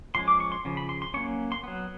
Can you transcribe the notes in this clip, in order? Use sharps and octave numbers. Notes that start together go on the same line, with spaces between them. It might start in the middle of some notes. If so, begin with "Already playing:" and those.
F3 G#3 C#4 C6
D6
C#6
C6
C#3 F3
B5
C6
C6
F#3 A#3 C#4 C#6
C6
F#3 B3